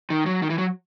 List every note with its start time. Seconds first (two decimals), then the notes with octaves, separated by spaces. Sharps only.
0.10 D#3
0.26 F#3
0.42 D#3
0.50 E3
0.58 F#3